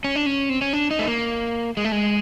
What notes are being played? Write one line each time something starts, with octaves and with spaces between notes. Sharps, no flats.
C#4
D4
C#4
C4
C#4
D4
D#4
A3
A#3
G#3
A3
G#3